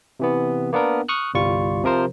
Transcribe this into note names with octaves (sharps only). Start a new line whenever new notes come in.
C3 E3 B3
A#3 B3 D4 A#4
C#6 D#6 F6 F#6
G1 C2 G3 F4 C#6
C3 F3 A#4 C5